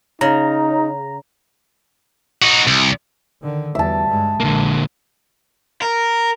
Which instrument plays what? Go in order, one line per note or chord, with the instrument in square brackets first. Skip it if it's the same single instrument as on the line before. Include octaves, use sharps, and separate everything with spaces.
[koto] C#3 [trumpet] D#4 [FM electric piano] A#5
[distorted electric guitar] D#4 F#4
C2
[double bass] D3 D#3
[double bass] E2 G3 [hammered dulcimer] E5 A5
[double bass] G2 G#3
[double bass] A#1 G#3 [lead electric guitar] D3 A#3
[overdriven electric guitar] A#4